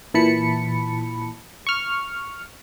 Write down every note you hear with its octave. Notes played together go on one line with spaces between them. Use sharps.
A#2 E3 A5 B5 C#7
C#6 F6